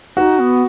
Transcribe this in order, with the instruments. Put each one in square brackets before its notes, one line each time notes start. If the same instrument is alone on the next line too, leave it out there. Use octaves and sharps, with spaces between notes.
[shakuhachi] D#4 [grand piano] F#4
[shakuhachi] B3